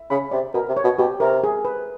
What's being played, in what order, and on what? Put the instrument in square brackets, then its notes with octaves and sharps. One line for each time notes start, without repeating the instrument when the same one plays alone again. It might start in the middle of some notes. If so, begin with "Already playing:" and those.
Already playing: [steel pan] E5
[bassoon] C#3 [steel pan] B5
[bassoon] C3 [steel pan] D5
[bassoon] B2 [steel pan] A#4
[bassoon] C3
[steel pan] C#5
[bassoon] B2
[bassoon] B2 [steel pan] G4
[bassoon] C3 [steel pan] A#4
[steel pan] G#4
B4